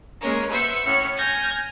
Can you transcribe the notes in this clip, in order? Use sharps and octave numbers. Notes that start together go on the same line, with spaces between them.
G#3 A#3 C#4 A#4
B4 C5 E5 F#5
A2 C#4 F#5
G#5 F6 G6 G#6 A#6